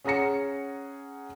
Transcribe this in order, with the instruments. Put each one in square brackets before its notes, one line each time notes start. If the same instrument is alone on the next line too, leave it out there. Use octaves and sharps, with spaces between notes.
[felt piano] C#4 G#4 F#5 A#5 A#6 C#7